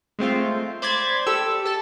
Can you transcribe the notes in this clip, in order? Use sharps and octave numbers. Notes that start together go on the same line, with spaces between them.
G#3 A3 C4 F4
C5 D5 B5 G#6 A6
G4 A4 E6
A4 A5